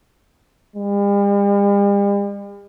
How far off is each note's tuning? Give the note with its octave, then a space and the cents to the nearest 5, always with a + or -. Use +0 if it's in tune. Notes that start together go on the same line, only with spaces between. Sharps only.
G3 +45